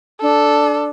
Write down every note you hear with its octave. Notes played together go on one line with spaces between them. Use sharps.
D4 A4